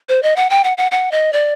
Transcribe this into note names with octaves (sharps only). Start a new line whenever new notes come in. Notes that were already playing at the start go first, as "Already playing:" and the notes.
C5
D#5
F#5
G5
F#5
F#5
F#5
D#5
D5